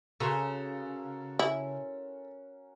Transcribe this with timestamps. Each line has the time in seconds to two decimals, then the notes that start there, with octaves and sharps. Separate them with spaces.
0.20 C#3 F#4 A4 A#4 C#5 A#5 C6
1.39 C#4 E4